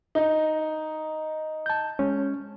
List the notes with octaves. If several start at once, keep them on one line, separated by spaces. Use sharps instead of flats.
D#4
A5 G6
G#3 C#4